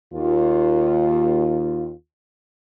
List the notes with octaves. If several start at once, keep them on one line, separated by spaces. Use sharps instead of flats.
D#2 F4